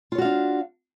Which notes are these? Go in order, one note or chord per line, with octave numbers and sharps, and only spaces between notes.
D4 F4 F#4 C#5 F5